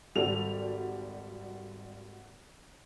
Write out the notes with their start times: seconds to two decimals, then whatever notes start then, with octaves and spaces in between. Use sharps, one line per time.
0.15 G#1 G3 F#4 A4 F7